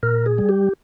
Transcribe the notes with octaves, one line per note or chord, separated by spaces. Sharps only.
A#2 A#4
G#4
G3
G4